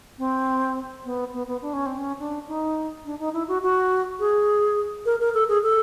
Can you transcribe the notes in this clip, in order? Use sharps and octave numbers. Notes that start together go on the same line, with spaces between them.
C4
B3
B3
B3
D4
C#4
C4
C#4
D4
D#4
D4
D#4
E4
F#4
F#4
G#4
A#4
A#4
A4
G#4
A4